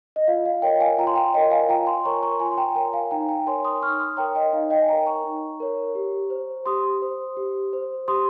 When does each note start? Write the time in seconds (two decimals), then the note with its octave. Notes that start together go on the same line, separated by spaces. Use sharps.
0.16 D#5
0.27 F4 F5
0.45 F5
0.62 A#4 C#5 D#5 G5
0.80 F5 G#5
0.98 F4 G5 A#5
1.07 C6
1.16 G5 A#5
1.33 A#4 C#5 D#5 G5
1.51 F5 G#5
1.69 F4 G5 A#5
1.86 G#5 C6
2.05 A#4 C#5 A#5 C#6
2.23 A#5 C#6
2.40 F4 G#5 C6
2.51 C6
2.57 G5 A#5
2.75 A#4 C#5 G5 A#5
2.93 F5 G#5
3.11 D#4 G5 A#5
3.29 G5 A#5
3.46 A#4 C#5 G#5 C6
3.64 C6 D#6
3.82 D#4 C#6 F6
3.99 C6 D#6
4.17 A#4 C#5 G5 A#5
4.35 D#5 G5
4.53 D#4 F5
4.70 D#5 G5
4.82 G#5
4.88 A#4 C#5 G5 A#5
5.06 A#5 C#6
5.24 D#4
5.60 A#4 C#5
5.95 G4
6.30 C5
6.66 G4 C6 D#6
7.02 C5
7.37 G4
7.73 C5
8.08 G4 C6 D#6